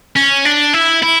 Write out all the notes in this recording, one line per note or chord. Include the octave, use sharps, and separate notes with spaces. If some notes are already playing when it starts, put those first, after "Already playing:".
C#4
D4
E4
E4